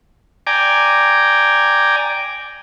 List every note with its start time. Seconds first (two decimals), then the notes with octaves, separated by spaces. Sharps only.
0.47 D5 G5 G#5 A#5 D6